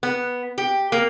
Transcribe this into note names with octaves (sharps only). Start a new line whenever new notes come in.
B3
G4
A#3